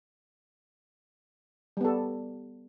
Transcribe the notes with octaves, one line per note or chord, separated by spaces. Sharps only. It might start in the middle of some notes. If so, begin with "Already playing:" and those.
G3 B3 A4